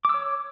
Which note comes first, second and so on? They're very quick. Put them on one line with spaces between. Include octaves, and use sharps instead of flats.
D6 E6 C#5